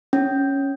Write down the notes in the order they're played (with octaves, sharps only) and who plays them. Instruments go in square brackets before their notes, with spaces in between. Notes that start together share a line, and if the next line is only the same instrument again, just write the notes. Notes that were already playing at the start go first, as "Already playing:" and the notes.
[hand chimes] C#4